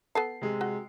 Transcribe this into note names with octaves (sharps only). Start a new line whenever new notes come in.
B3 A4 A5 C7
C3 G#3
F#4